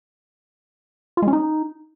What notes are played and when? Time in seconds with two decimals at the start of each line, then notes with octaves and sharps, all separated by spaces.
1.17 F4
1.22 G#3
1.28 C#4
1.33 D#4